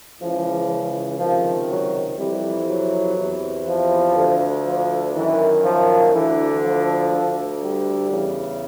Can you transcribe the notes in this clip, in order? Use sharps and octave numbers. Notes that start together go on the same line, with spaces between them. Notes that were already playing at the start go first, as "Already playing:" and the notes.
C#2 C#3 E3 F3
C#2 C3 D#3 F3
F#3
F2 C3 E3 G3
F#3
E2 C3 E3
F3
D2 D3
F3
F#2 D#3 E3
F3
D2 D3 E3
F3
D2 D3
G3
E2 C#3 E3